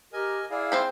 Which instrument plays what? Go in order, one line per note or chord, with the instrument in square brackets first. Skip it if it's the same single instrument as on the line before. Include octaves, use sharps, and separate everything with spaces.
[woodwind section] G4 A#4 [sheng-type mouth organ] D#5 G#5
[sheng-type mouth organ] E4 G#4 [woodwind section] D5 F5
[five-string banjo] C4 C5 B5